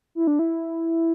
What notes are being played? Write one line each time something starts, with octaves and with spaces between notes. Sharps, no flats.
E4
D4
E4